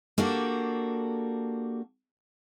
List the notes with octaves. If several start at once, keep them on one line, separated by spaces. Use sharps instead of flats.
A#3 D4 F#4 G4 A4